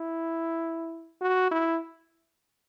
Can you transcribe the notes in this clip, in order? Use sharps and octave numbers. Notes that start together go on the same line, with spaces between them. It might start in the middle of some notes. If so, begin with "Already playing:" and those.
Already playing: E4
F#4
E4